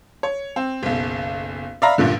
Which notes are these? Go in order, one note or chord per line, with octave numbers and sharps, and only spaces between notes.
C#5
C4
F#1 B1
D5 E5 F5 A#5 B5
A1 G2 A#2 D3